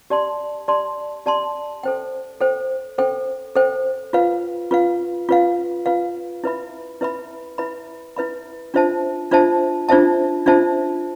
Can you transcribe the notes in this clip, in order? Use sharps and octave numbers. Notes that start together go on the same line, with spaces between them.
G4 D5 A5 C6
G4 D5 A5 C6
G4 D5 A5 C6
A4 C5 G5
A4 C5 G5
A4 C5 G5
A4 C5 G5
F4 B4 F5
F4 B4 F5
F4 B4 F5
F4 B4 F5
E4 B4 E5 B5
E4 B4 E5 B5
E4 B4 E5 B5
E4 B4 E5 B5
D4 F4 C5 E5 A5
D4 F4 C5 E5 A5
D4 F4 C5 E5 A5
D4 F4 C5 E5 A5